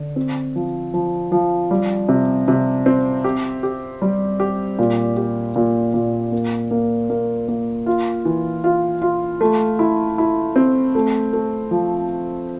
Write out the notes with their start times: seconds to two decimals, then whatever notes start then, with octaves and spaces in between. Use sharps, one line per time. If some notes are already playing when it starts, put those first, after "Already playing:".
Already playing: D3
0.16 C4
0.56 F3
0.94 F3
1.32 F3
1.71 G3
2.09 C3
2.48 C3
2.86 C4
3.24 G4
3.63 G4
4.02 G3
4.40 G4
4.79 A#2
5.17 G4
5.56 A#2
5.94 A#2
6.32 A#3
6.71 A#3
7.10 A#3
7.48 A#3
7.86 F4
8.25 E3
8.64 F4
9.02 F4
9.41 A3
9.79 E4
10.18 E4
10.56 C4
10.95 A3
11.33 A3
11.71 F3